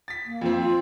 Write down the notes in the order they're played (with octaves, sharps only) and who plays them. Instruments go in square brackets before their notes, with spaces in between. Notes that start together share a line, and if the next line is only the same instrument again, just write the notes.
[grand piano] A6 B6
[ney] A#3
[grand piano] F2 F3 C4
[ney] F4